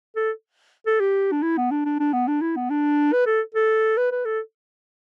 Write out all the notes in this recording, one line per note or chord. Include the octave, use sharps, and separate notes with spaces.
A4
A4
G4
D4
E4
B3
D4
D4
D4
B3
D4
E4
B3
D4
B4
A4
A4
B4
B4
A4